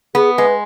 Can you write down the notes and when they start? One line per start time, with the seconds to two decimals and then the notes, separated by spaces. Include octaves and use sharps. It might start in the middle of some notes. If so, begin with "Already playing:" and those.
0.15 B3 G#4
0.37 G#3 B4